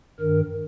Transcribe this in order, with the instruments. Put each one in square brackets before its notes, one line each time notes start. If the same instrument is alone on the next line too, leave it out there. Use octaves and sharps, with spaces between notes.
[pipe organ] G2 D#3 A#4